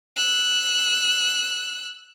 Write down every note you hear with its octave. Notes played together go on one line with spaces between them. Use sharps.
E6 F#6